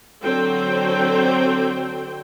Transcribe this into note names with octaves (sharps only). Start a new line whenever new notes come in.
D3 F#3 C4 A4 C5 G5